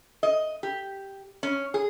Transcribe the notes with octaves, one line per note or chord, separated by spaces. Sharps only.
D#5
G4
C#4
G#4